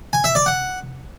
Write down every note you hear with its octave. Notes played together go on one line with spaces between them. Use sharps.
G#5
E5
D5
F#5